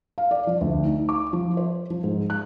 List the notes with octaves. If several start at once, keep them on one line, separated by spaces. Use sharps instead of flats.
F5
D5
F3
D2
D#4
D6
F3
C5
F3
G#2
F#6